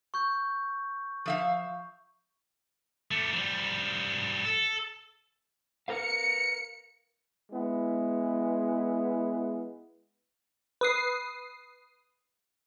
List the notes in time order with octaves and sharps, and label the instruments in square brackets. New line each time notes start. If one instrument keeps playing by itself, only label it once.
[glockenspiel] C#6 G6
[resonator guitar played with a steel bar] F3 E5 F5
[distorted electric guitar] A3 G4
F3 G3
A4
[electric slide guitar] A#4 B4 F5 [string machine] C#7
[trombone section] G#3 B3 E4
[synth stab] B4 D#6 C7